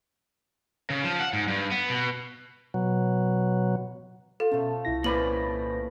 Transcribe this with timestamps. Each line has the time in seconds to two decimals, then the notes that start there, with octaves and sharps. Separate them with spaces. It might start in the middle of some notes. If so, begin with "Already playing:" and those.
0.90 C#3
1.04 F3
1.20 F#5
1.33 G#2
1.48 G2
1.71 B3
1.90 B2
2.74 B2 F#3
4.40 F4 A4
4.52 B2 F3 A3 C#4
4.85 C2 E4 A#6
5.04 A#2 C#4 B4 C5 D5 B5 F#7